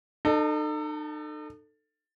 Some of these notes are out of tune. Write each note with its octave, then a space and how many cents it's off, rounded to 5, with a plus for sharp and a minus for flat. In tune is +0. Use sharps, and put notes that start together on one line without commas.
D#4 -40 A4 +15